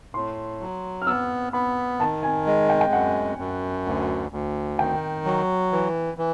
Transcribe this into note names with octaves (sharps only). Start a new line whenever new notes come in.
A2 C6
F#3
F6
B3 E6
B3 B5
D#3 A5
G#5
G#3
G5
G5
F#2 F#5
F#2
D2
D2
D#3 G5
F#3
E3
E3